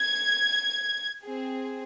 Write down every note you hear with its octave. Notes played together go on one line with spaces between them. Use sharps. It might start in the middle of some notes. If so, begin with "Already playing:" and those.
Already playing: G#6
C4 G#4